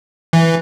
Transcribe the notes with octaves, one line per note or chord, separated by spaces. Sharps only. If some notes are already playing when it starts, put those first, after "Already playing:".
E3